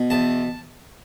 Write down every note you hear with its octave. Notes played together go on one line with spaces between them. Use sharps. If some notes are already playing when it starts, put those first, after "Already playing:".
Already playing: B2
E2 A5